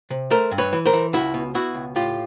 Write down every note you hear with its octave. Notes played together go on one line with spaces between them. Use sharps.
C3
A3 A#4 C5
G2
B4 C#5
E3
A#4 C5
E3
C#2 E4 F#4
B2
B2 E4 F#4
C#2
A2 F4 G4